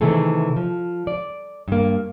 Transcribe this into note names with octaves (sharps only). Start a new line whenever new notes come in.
C3 D#3 E3 A3 G#4 A4
F3
D5
G2 A#3